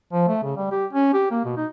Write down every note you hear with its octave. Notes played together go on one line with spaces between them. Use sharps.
F3
A3
C#3
G3
G4
C#4
G4
A#3
B2
D#4